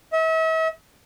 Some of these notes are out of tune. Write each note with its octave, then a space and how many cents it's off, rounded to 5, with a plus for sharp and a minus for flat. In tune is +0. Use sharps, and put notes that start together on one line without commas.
E5 -40